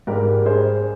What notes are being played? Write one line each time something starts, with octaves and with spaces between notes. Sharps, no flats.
G#2 G3 G4 A#4
G#4 C5